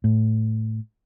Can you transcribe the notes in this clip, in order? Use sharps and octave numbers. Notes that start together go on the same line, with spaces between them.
A2